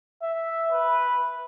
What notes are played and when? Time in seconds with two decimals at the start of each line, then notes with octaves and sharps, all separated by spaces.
0.23 E5
0.72 B4